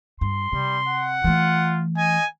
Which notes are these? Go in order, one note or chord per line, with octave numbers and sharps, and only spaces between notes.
G2 C6
C3 G3
F#5
E3 A3 F4
D#5 G#5